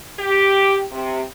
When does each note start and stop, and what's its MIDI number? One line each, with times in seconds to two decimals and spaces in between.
0.19 0.84 67
0.92 1.21 48